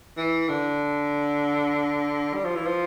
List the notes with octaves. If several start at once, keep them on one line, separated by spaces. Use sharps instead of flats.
E3
D3
G3
F3
E3
F3